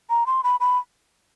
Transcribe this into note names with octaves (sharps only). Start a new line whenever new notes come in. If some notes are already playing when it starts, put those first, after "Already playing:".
A#5
C6
B5
B5